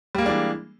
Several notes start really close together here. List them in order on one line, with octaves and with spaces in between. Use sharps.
G3 A#3 G#3 D4 E3